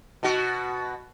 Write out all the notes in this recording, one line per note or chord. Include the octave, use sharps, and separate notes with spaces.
B2 F#4